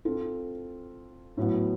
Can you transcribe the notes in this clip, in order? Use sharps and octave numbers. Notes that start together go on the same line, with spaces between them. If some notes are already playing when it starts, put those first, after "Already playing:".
C4 F4 A4
A2 F#3 B3